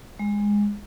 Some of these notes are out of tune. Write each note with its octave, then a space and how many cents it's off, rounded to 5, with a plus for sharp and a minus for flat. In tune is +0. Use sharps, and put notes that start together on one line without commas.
G#3 -15